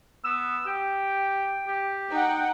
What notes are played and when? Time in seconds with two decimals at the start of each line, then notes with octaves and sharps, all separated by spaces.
0.25 B3 E6
0.66 G4 G5
1.67 G4
2.11 D#4 F#5 G5